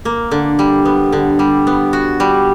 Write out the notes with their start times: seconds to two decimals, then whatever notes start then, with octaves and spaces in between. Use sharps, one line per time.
0.05 A#3
0.31 D3
0.59 G3
0.85 B3
1.12 D3
1.39 G3
1.67 B3
1.93 F#4
2.20 G3